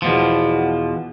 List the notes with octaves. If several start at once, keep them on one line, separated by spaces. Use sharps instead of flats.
E2 B2 F3